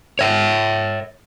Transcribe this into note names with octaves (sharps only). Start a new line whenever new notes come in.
C#5 E5